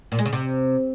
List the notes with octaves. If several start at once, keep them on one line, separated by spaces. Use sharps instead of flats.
A#2
G#3
C#3
C3